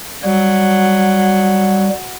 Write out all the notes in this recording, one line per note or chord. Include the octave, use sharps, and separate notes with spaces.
F#3 G3